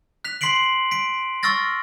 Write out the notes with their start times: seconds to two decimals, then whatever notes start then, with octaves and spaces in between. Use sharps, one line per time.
0.24 F#6 B6 F7
0.41 C6 B6 C7 D7 F#7
0.91 B6 D7
1.43 C#6 E6 F6 A6 A#6